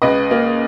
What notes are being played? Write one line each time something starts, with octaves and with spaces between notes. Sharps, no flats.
C#2 B4 D#5
A#3